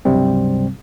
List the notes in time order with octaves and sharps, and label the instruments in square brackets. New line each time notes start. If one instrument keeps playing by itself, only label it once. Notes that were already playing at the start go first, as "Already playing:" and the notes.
[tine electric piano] C#2 G2 C3 F#3 G3 C4